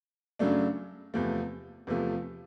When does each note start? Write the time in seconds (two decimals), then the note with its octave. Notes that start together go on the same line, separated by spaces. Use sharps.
0.39 F#2 C#3 F#3 A3 D4
1.14 E2 C3 F3 A3
1.87 E2 C3 F3 A3